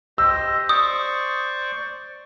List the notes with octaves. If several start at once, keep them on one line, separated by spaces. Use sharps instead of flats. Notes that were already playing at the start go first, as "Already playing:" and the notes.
G4 C5 D#5 E6
C5 D5 C#6 D#6